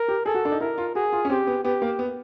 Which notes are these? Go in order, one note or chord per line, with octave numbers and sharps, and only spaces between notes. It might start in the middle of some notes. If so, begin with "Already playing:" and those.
Already playing: A#4
G4
G#4 A4
F#4
D4
D#4
E4 A#4
F4
F#4 G#4
F4
C#4
C4 G4
B3
B3 G4
A#3
B3